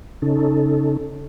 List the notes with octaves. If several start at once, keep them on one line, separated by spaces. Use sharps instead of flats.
C#3 C#4 D#4 A4